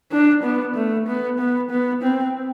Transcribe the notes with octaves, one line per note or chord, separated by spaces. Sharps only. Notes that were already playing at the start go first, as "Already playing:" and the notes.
D4
B3
A3
B3
B3
B3
C4